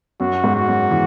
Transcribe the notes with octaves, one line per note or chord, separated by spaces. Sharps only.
F#2 F#4
G#2
F#4
F#2
E3